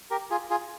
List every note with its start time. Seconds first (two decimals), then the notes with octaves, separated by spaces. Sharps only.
0.11 G4 A#4
0.31 F4 G#4
0.50 F4 G#4